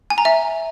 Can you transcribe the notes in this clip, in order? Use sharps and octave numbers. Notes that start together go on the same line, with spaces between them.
G#5
A#5
E5